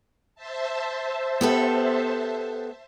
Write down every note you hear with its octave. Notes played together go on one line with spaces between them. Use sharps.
C5 E5 A5
B3 G4 A4